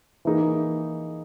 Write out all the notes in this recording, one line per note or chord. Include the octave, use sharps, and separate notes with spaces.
E3 A#3 D#4 G#4